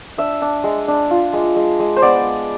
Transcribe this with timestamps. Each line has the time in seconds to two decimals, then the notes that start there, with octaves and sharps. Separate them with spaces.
0.18 D4 E5
0.41 D4
0.64 G#3
0.88 D4
1.11 F4
1.33 G#3
1.56 G#3
1.79 G#3
1.96 C5
2.02 B3 D5